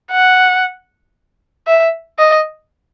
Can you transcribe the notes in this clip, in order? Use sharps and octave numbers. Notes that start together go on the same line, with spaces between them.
F#5
E5
D#5